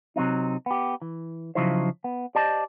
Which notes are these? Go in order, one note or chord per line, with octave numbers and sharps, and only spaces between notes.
C3 F#3 C4 D#4
B3 G4
E3
C#3 F3 F#3 D#4 E4 C5
B3
G4 C5 D5 D#5 A5